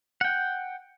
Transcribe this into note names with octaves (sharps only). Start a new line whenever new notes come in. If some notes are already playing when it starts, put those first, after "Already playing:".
F#5 G5